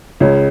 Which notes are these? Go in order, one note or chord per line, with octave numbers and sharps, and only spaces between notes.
C#2 C#3 G#3 C#4